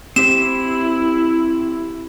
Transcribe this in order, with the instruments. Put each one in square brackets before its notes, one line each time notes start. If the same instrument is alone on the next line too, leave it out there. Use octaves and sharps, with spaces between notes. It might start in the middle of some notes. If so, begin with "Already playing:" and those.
[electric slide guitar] C4 G4 C5 [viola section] E4 [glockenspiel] E7